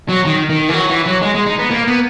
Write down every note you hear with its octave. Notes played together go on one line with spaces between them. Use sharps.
F#3
D#3
D#3
E3
F#3
E3
F#3
G#3
G#3
D#4
B3
A#3
B3